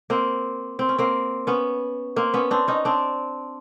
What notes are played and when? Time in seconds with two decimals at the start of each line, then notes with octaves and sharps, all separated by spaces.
0.10 A#3 C4
0.79 C4
0.89 C#4
0.98 A#3 C4
1.47 B3 C#4
2.16 A#3 C4
2.34 B3 C#4
2.51 C4 D4
2.68 C#4 D#4
2.85 C4 D4